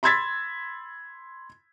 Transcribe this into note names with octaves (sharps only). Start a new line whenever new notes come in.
B5 C6 E6 G#6 A6 B6